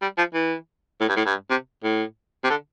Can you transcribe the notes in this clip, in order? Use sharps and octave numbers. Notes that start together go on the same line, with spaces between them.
G3
F3
E3
A2
G2
A2
G2
C3
A2
C3
D3